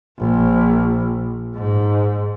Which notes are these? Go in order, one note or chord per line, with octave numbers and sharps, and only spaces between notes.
A#1
G#2